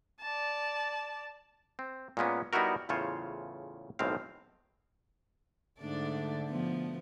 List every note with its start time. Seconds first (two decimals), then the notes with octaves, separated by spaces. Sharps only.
0.21 D5 A5
1.79 C4
2.17 A#2 G#3 A#3 B3 C#4
2.53 G3 B3 D#4 E4 F#4 A#4
2.89 E2 A2 C#3 F4 C5 C#5
3.99 B1 A2 D#3 G#3 C4 F5
5.80 G#2 D3 A3 D4 D5
6.49 B2 F3 B3